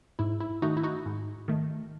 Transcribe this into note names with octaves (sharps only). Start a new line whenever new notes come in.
G#2 E4
E4
D#3 A3 D#4 F#4
E4
D#4 F#4
G#2
D#3 A3